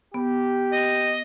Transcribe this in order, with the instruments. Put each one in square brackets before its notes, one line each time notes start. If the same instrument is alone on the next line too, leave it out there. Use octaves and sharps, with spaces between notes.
[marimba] B3 [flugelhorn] G4
[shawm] D#5